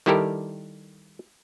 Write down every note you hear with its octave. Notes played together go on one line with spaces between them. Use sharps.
D#3 G3 E4 G4 A4 A#4